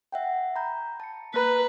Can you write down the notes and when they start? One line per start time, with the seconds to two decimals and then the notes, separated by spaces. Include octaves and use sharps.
0.12 E5 F#5 G5
0.56 A#5 B5 G6
1.00 A5 C#7
1.34 A#3 B4 A#5